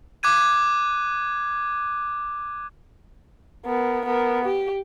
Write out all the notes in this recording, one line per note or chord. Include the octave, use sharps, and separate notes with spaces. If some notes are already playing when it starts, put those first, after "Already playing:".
D6 F#6 G#6 D#7
B3 A#4
B3 A#4
G4